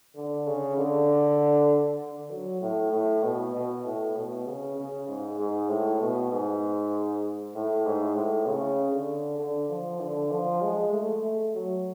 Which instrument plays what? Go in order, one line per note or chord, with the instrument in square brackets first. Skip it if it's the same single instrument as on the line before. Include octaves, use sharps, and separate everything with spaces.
[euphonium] D3
C#3
D3
D3
F#3
A2
A2
B2
B2
A2
B2
C#3
C#3
G#2
G#2
A2
B2
G#2
A2
G#2
A2
C#3
D3
D3
F3
D3
F3
G#3
A3
A3
F#3